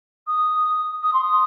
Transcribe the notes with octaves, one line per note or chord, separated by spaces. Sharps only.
D#6
D#6
C6
D#6